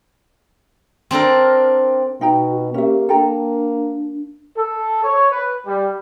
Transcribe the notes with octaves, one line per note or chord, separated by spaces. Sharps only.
C4 D4 A4 A#4
B2 D#4 F#4 G5 A#5
A#3 C#4 G4 E5
D4 A4 G5 A#5
A4
C#5
B4
G3